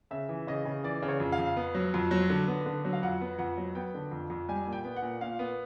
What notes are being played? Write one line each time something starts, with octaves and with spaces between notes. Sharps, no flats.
C#3 E5
E3
C#3 D#5
C#3
E3 D5
C#3
C#5
F2
F5
F2
B3
F#3
F2
F#3
D3
B3
D3
F#3
F5
F2 F#5
B3
F2 F#5
F#3
B3 G5
D3
F2
F2
G3 G#5
A#2
G5
B3
F#5
A#2
A#2 F5
B3